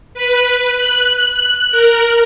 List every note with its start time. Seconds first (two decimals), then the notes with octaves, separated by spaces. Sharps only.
0.14 B4
0.64 F#6
1.71 A#4